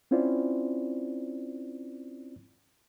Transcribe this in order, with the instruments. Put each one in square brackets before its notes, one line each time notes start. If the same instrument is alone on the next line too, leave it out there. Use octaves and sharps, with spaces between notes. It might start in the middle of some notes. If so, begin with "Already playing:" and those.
[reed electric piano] C4 C#4 E4 F4 C5 D5